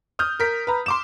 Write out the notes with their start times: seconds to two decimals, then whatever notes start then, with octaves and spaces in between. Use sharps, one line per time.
0.19 D#6 F6 G6
0.40 A#4 B6
0.67 B4 A#5
0.86 C6 D6 E7